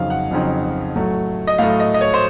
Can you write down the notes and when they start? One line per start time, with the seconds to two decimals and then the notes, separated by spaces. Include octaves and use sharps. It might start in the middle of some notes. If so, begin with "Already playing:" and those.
Already playing: F2 C#3 F#3 C4 D#4 F5
0.10 F#5
0.31 F2 C#3 F#3 C4 D#4
0.95 A2 F#3 A3
1.47 D#5
1.58 A2 F#3 A3 F5
1.80 D#5
1.94 D#5
2.01 C#5
2.14 C5